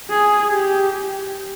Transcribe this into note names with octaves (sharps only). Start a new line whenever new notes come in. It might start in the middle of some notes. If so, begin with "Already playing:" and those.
G#4
G4